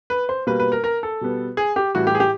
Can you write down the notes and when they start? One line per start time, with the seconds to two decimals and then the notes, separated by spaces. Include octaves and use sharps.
0.10 B4
0.29 C5
0.47 B2 G3 A#3 B4
0.60 B4
0.72 A#4
0.84 A#4
1.03 A4
1.21 B2 G3 B3
1.57 G#4
1.76 G4
1.95 A2 E3 G3 F#4
2.07 G4
2.15 G#4
2.20 G4